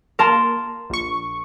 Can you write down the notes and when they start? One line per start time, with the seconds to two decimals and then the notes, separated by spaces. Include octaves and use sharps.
0.19 A#3 A#4 A5 C6
0.90 A#1 C#6